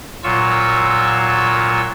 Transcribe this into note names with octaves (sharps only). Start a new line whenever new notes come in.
A#2 F#3 F4 C#6 E6